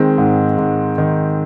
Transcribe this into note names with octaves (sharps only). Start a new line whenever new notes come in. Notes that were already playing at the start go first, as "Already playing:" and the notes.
Already playing: D#3 G#3 C4
G#2
G#2
D#3